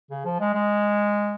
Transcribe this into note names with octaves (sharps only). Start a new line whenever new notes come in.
C#3
F3
G#3
G#3